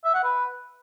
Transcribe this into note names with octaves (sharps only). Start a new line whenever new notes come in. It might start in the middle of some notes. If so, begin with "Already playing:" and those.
E5
F#5
B4